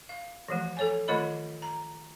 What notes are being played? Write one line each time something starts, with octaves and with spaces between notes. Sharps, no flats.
F5
E3 F3 A3
A4 C#5 G#5
D#3 A3 F4 C#5 D#5 B5
A#5